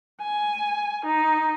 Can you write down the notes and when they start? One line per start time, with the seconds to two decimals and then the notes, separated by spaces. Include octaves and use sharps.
0.21 G#5
1.06 D#4